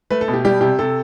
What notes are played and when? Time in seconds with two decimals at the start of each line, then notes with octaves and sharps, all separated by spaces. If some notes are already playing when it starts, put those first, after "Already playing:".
0.10 A3 B4
0.21 A4
0.28 B2
0.33 G4
0.45 G3 G4
0.61 C3 G4
0.79 C3 A4